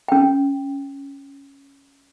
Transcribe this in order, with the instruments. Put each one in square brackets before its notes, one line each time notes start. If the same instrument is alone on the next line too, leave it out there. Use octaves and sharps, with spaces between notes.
[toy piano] C#4 G5